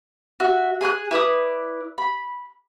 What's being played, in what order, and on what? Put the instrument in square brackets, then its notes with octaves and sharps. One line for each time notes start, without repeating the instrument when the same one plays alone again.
[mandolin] F#4 E5
G#4 G#5 C6 F#6
E4 B4 D5 D#6
B5